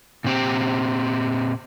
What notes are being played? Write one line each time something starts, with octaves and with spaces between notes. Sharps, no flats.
A#2 C4 G4